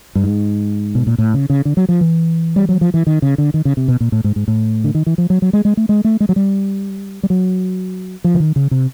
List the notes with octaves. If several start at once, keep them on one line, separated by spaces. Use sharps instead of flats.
G2
G#2
B2
A#2
A2
C#3
C#3
D3
F#3
F3
E3
G3
F#3
F3
E3
D#3
C#3
D3
D#3
C#3
C3
B2
A#2
A2
G#2
G#2
A2
D3
D#3
E3
F3
F#3
F#3
G#3
G#3
A3
G#3
A3
G#3
F#3
G3
G3
F#3
F3
D3
D#3
C#3
C3